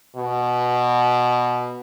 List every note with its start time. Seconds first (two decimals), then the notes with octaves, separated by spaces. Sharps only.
0.16 B2